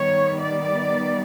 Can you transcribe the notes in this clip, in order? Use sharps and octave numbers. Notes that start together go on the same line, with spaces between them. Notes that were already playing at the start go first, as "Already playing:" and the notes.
Already playing: D#3 G3 B3 C#5
D5